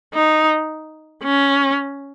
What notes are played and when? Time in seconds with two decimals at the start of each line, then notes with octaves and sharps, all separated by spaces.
0.14 D#4
1.24 C#4